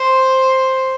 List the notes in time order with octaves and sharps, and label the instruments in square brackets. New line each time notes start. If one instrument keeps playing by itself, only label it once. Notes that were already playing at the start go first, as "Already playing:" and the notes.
Already playing: [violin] C5